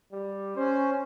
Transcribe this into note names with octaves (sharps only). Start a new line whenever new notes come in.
G3
C#4 C5